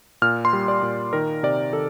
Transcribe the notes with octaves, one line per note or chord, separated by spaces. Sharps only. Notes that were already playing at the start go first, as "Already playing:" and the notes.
A#2 F6
C6
G3
D5
A#2
D#3 A#4
C3 D5
D#3 A4